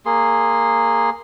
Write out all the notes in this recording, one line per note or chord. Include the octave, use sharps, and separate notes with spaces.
A#3 G#4 C6